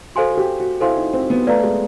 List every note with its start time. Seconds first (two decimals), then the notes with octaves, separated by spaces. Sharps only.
0.15 F#4 A4 C5 F5 G#5 C6
0.31 F#4
0.37 G4
0.60 F#4
0.81 E4 A4 C5 F5 G#5 C6
0.97 D#4
1.13 C4
1.30 B3
1.47 A3 B4 D5 F5 A#5
1.63 G#3